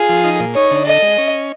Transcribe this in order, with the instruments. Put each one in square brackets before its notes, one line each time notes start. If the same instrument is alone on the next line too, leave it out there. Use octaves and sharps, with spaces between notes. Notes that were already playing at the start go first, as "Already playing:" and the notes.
Already playing: [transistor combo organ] F4 [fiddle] G#4
[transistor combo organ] F3
D#4
A#2
[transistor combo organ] D#4 [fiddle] C#5
[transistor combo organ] D3
[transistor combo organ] A4 [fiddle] D#5
[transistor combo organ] G#3
C#4